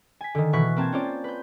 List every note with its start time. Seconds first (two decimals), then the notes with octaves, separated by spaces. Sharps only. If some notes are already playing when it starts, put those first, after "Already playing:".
0.21 G#5 B6
0.35 D3 D#3
0.53 B2 E3 C#6 F#6 B6
0.76 A#3 C4 A5 G#6
0.92 C#4 F4 C5 D5
1.24 B4 G6